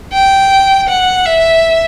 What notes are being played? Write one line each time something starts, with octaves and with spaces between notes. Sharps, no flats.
G5
F#5
E5